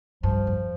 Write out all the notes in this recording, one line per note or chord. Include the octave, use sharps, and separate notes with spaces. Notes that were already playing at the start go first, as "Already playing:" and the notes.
G2 F3
F2